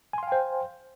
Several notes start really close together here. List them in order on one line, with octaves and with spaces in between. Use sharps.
G#5 C6 F5 G5 C5